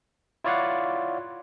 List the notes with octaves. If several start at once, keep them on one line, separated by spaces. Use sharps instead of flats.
E4 F4 C#5 D5 F5 F#5